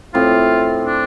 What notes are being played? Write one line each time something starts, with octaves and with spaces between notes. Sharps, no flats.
A2 F3 C4 F4
D4